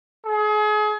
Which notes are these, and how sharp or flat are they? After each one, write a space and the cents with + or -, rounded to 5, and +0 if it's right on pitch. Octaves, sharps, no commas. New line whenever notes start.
G#4 +35